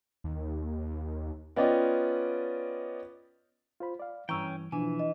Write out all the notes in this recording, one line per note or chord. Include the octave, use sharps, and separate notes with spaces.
D#2
B3 C#4 F4 D5 D#5 G5
F4 C5 B5
D5 F5
G2 E3 C#4 G5 A#5 C#6 E6
B2 E3 F3 D4 G#5
D#5